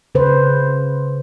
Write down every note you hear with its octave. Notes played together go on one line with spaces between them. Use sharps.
C#3 B4 C5